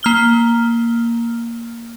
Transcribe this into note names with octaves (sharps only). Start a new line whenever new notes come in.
A#3 F6 G7